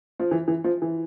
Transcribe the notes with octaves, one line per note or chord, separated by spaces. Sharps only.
F3
E3
E3
F3
E3